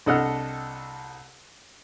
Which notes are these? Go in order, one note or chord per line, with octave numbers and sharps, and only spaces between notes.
C2 D4 A4 D#5 F#5 F6